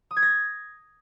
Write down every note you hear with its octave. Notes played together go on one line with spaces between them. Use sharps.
D#6
G#6
A#6